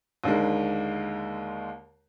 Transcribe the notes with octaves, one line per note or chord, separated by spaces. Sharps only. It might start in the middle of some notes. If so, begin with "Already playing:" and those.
D#2 D3 D#3 G#3